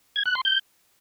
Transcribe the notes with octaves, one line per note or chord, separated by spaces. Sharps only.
G#6
F#6
C6
G6